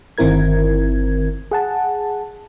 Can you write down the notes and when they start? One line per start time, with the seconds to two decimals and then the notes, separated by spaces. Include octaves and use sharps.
0.18 G1 D#3 C4 E4 A#4 G#6
1.51 G#4 F#5 A5